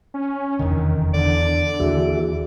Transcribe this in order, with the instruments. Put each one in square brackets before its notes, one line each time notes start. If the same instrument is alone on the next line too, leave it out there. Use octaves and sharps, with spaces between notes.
[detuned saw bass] C#4
[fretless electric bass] F1 E2 D3 [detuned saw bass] D#3
[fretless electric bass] E2 [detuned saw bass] D3 [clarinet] D5
[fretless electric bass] D#2 E3 [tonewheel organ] F#4 G#4 E5